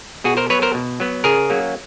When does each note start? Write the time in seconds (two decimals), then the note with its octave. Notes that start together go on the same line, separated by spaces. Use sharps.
0.24 B2 F#4 G#4
0.37 A#4 C5
0.50 F#3 B3 B4 C#5
0.62 A#4 C5
0.74 B2
1.00 F#3 B3
1.24 C#3 G#4 A#4
1.50 F#3 A#3 C#4